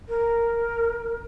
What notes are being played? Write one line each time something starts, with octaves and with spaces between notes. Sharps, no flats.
A#4